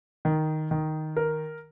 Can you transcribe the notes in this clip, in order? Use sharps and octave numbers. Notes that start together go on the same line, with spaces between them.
D#3
D#3
A#4